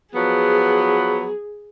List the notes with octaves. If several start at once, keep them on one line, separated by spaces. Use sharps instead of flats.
F3 F#3 B3 G#4